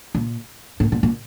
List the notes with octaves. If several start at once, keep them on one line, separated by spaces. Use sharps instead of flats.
A#2
A2
A#2
A#2